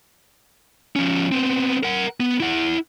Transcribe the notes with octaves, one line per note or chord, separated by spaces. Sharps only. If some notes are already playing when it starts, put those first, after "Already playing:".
F3 C#4
B3 C4
A#4 F#5
B3
E4 F#5